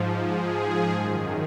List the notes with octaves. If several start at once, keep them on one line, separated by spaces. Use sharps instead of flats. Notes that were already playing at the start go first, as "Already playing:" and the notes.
Already playing: G#2 F3
G#4
F#2 D#3